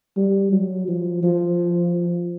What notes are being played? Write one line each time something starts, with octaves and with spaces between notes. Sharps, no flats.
G3
F#3
F3
F3